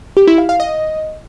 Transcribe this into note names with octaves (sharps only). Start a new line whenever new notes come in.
G4
E4
F5
F5
D#5